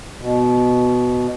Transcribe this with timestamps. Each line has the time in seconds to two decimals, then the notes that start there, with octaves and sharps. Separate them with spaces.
0.19 B2